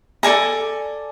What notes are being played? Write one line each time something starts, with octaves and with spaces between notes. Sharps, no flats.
A4 D5 G#5 A#5